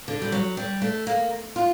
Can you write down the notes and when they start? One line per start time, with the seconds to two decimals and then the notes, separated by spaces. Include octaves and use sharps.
0.08 D3
0.22 G3
0.32 F#3
0.57 G3
0.82 A3
1.07 A#3
1.56 F4